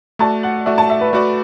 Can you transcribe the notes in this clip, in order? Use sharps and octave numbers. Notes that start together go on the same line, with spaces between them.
A3 F#4 D5 A5
F#5
A3 F#4 D5 E5
A5
E5
B4
A3 F#4 B4 D5